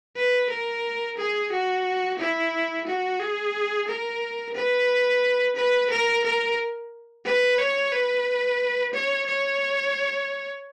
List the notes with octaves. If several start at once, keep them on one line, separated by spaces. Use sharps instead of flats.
B4
A#4
G#4
F#4
E4
F#4
G#4
A#4
B4
B4
A#4
A#4
B4
C#5
B4
C#5
C#5